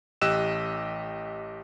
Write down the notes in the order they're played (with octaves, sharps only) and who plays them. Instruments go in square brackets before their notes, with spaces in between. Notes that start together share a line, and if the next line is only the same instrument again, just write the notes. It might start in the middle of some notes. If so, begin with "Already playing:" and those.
[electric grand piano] A1 G4 D#5 E6 F#6 E7